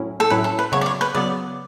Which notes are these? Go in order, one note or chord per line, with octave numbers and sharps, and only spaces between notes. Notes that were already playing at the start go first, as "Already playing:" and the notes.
Already playing: A2 F#3 C#4 E4
A4
A2 F#3 C#4 E4 B4
A4
B4
C#3 F#3 B3 C#5
D5
C#5
B4
C#3 F#3 B3 D5